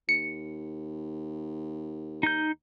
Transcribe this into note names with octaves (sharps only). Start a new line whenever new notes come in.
D#2 C#7
D#4 G6